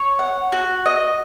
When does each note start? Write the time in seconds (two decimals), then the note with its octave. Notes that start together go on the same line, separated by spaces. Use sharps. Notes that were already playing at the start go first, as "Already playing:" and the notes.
Already playing: C#5
0.19 F#5
0.52 F#4
0.86 D#5